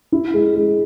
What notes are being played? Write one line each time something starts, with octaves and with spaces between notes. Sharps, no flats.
E4
G#3
G#3